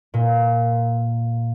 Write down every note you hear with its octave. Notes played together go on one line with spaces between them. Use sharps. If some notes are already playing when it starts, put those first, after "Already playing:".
A#2